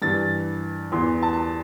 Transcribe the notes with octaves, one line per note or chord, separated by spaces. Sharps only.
G2 E3 A6
E2 E3 C6
A5